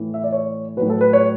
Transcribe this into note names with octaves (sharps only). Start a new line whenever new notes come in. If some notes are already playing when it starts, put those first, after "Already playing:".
Already playing: A2 E3
E5
D5
C#5
F#3 B4
A2
A4
B4
C#5